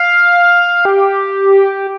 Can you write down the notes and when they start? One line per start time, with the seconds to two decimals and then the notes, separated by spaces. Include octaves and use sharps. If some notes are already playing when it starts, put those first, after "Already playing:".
Already playing: F5
0.85 G4